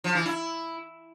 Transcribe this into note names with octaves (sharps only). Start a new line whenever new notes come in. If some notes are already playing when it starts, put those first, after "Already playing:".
F3
E3
E4